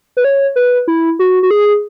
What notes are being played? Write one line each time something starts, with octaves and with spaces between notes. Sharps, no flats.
B4
C#5
B4
E4
F#4
F#4
G#4